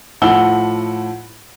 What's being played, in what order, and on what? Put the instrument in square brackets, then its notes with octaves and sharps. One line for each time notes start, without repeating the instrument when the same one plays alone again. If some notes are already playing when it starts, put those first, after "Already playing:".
[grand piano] A2 F3 F#5 E6 G7